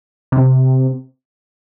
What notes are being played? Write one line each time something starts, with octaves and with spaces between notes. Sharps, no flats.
C3